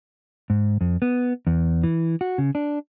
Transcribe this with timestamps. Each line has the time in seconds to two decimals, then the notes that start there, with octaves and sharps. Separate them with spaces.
0.50 G#2
0.81 F2
1.02 B3
1.47 E2
1.83 E3
2.21 F#4
2.38 C#3
2.55 D4